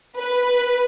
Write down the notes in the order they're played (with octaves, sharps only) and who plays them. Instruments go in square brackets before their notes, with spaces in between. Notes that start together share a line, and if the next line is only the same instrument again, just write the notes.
[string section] B4